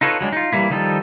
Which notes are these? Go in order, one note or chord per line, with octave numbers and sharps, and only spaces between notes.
D#4 F4 A4 B4 C#5
F#3 G#3 D4
D#4 F4
E3 G3 A#3 E4
D#3 F3 G3 D#4 A4